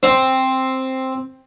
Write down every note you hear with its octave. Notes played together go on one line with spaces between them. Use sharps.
C4